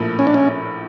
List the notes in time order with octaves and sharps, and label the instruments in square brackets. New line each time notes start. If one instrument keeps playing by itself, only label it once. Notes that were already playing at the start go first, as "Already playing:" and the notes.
Already playing: [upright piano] A#1 A2 F3 A#3
[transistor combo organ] C#4
D4
C#4